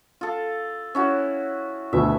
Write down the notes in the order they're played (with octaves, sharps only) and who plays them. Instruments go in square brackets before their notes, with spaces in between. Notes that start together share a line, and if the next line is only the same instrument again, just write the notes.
[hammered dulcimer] F4 A4
C#4 E4 F#4
[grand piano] D2 B2 D3 [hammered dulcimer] E5